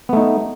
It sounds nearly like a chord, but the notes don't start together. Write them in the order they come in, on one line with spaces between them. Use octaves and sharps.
B3 A3 D#4